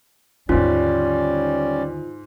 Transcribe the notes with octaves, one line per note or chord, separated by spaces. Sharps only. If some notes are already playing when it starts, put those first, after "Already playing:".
D#2 G#2 D3 G3 C#4 F4 D5